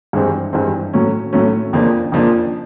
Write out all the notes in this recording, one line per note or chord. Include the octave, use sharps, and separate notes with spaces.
G2 E3 G#3 C4
G2 E3 G#3 C4
A2 F#3 A3 C#4
A2 F#3 A3 C#4
F2 C#3 F3 A#3 D4
F2 C#3 F3 A#3 D4